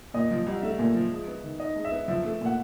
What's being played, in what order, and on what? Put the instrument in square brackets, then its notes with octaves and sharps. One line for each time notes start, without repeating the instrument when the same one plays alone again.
[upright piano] A#2 [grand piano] D#5
[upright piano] F3
C2
[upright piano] A3 [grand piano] E5
[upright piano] A#2
F3
G#3
B3
D#3
[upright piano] D#4 [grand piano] D#5
[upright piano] G#3
[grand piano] E5
[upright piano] B3
[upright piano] F3 [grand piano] E5
[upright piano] A3
[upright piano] A#2 [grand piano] F#5